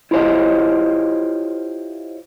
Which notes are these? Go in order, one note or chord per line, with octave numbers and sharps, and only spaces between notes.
E4 F4 G4 C5 C#5 D#5